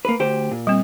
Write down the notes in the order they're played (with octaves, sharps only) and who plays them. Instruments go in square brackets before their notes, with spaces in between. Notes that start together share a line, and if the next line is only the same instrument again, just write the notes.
[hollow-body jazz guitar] A#3 B4
D2 G4 C5
A#2
[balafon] G3 C4